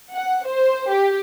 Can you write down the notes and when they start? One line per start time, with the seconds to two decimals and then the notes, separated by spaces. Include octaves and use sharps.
0.14 F#5
0.46 C5
0.92 G4